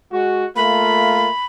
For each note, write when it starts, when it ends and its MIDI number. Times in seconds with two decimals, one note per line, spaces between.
0.11 0.44 56
0.11 0.44 66
0.56 1.28 57
0.56 1.28 58
0.56 1.28 65
0.56 1.46 83